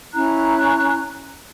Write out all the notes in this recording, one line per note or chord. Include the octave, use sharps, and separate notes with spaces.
C#4 E4 A#5 F#6